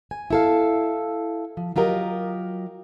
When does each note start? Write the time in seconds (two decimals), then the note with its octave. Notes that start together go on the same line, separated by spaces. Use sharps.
0.11 G#5
0.30 E4 A4 F5
1.57 F3
1.76 F#3 F4 G4 A#4 D#5